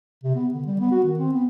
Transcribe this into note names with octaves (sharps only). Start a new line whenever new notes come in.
C3
B3
D3
G3
B3
F#4
D#3
C4
B3